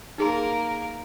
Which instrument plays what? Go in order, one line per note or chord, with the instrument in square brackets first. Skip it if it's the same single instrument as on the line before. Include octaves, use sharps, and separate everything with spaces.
[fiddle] A#3 A#4 [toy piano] D#4 G#4 C6